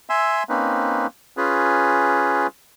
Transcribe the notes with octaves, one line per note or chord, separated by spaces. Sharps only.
E5 G#5 C6 E6
A#3 C4 C#4 D#4 B4
C#4 F4 G#4 B4